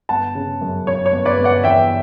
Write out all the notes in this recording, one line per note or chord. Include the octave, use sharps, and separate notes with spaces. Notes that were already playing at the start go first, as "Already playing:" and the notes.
G1 F#5 A5
C#3
F#2
F#2 C#5
C#5
G1
B4 D5
G1
D5 F#5
E2 E5 G5